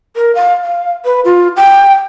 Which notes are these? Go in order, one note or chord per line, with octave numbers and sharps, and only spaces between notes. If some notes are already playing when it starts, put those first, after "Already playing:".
A#4
F5
F5
B4
F4
G5